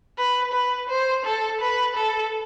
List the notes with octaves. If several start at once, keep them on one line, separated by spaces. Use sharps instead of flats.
B4
B4
C5
A4
B4
A4